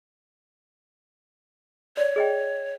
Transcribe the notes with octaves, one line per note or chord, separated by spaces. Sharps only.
C#5 D5
G#4 D#5 G5